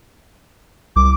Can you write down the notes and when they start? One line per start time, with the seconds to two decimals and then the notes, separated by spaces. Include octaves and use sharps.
0.96 C2 D6